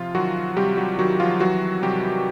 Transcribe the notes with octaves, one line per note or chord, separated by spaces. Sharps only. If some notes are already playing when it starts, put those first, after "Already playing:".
Already playing: C3 F3 F4
D#3 F#3 F#4
C3 G3 G4
F#3 F#4
D#3 F#3 F#4
F3 F4
E3 F#3 F#4
C3 G3 G4